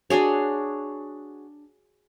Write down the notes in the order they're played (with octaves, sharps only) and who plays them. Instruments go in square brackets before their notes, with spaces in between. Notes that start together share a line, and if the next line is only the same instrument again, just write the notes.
[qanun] D4 F#4 G#4 C#5